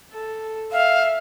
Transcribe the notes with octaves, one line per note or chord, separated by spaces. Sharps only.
A4
E5 F5